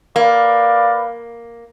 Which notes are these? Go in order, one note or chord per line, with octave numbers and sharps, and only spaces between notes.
A#3 B4 D5 F5